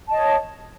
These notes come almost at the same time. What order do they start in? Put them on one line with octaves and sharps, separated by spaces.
A5 D#5 C#5